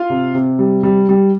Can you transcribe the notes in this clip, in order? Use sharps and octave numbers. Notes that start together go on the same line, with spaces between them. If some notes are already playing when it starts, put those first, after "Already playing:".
Already playing: F4 F5
C3
C3
G3
G3
G3